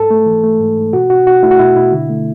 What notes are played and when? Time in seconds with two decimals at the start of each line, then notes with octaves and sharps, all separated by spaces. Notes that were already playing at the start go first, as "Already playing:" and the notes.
Already playing: G#2 A4
0.10 A3
0.26 E3
0.44 A3
0.60 G#2
0.77 G#2
0.93 B2 F#4
1.09 B2 F#4
1.27 B2 F#4
1.43 A3 E4
1.51 F#4
1.59 B2 E4
1.75 B2 E4
1.92 D3
2.09 A3